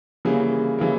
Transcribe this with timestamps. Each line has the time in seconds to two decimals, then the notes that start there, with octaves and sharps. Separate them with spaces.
0.25 C#3 E3 G3 A#3 G#4
0.79 C#3 E3 G3 A#3